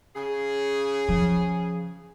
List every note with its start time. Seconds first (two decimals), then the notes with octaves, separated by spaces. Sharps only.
0.16 C#3 G#4
1.09 F3